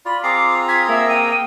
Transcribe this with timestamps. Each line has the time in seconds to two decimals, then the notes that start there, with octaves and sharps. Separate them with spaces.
0.06 F4 D5 B5
0.23 C4 G#4 A#5 D6 C7
0.68 G#6 B6
0.89 A#3 E5
1.09 G5 D#7